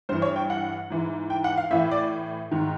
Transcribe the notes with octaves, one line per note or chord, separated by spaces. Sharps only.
G2 E3 C5
C#5
G5
F#5
G#2 E3
G5
F#5
F5
A2 E3 E5
D5
G#2 D#3